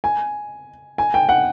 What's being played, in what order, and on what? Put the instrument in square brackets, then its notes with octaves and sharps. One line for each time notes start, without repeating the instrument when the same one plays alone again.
[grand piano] G#5
G#5
G5
F#5